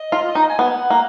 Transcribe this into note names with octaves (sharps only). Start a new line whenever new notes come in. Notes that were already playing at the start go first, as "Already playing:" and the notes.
Already playing: D#5
F4
D#4
G#5
B3 F#5
A#3